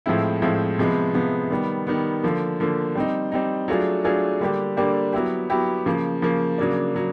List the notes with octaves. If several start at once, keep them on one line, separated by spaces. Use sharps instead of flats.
A2 F3 G#3 C4 E4
A2 F3 G#3 C4 E4
C3 F3 G#3 B3
C3 F3 G#3 B3
D#3 G3 B3
D#3 G3 B3
D3 F3 A#3
D3 F3 A#3
G3 C4 D#4
G3 C4 D#4
F#3 A3 D4 F4 G#4
F#3 A3 D4 F4 G#4
D3 G3 A#3 D4 G4
D3 G3 A#3 D4 G4
F#3 B3 E4 G4
F#3 B3 E4 G4
C#3 F3 A#3
C#3 F3 A#3
C#3 F#3 A#3 D4
C#3 F#3